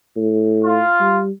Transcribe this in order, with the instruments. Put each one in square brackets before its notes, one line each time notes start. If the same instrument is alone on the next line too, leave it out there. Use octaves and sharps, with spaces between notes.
[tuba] A2
[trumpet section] F4
[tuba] G3